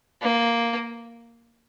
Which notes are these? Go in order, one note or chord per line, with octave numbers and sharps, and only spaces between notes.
A#3